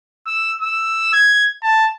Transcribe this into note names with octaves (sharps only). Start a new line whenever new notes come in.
E6
E6
G#6
A5